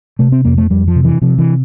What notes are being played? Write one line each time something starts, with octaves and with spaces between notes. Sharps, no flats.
C3 A3
C4
F2 A#3
A3
F2 G3
F3
C3
E3
C3 F3
E3